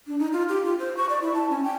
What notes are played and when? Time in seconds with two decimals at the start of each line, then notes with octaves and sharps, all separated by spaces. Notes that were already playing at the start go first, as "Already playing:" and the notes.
0.07 D4
0.19 D#4
0.33 F4
0.49 G4
0.64 F4
0.79 C5
0.97 C#6
1.09 D5
1.22 E4
1.34 A5
1.50 C#4
1.64 G5